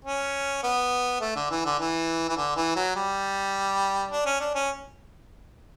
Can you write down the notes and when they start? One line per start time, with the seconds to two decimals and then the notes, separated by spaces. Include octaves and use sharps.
0.05 C#4
0.63 B3
1.21 A3
1.36 D3
1.50 E3
1.65 D3
1.79 E3
2.29 E3
2.37 D3
2.56 E3
2.76 F#3
2.96 G3
4.11 D4
4.26 C#4
4.40 D4
4.55 C#4